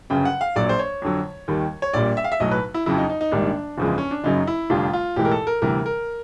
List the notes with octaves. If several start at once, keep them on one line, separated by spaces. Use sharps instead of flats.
G1 F#2 C#3 G5
F#5
F5
A#1 A#2 F#3 D5
C5
C#5
F2 D3 F#3
D#2 D#3 G3
C#5
A#1 A#2 G3 D5
E5
F5
E5
B1 A2 F#3 D#5
B4
E4
F2 C#3 F#3 E4
D#4
D#4
D#4
A#1 G#2 D#3 G3 D4
F#1 E2 C#3 F3 G#3
C#4
D4
F#1 F#2 C#3 F#3 D#4
E4
F1 F2 D3 G3 F4
F4
B1 A2 E3 G#3 G4
A#4
A4
A#4
D2 C3 E3 G3 A#4
A#4